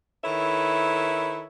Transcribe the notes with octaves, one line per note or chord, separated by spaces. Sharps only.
D#3 E4 A4 B4 C#5 E5